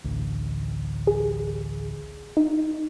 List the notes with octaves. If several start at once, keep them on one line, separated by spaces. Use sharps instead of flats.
A1 D2
G#4
D#4